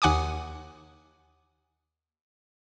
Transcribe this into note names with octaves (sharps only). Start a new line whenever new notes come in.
D#2 F#5 G#5 D6 D#6